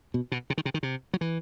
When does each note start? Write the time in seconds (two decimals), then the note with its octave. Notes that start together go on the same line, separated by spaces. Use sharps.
0.14 B2
0.32 B2
0.50 C3
0.58 D#3
0.65 C3
0.74 D#3
0.83 C3
1.14 F#3
1.21 E3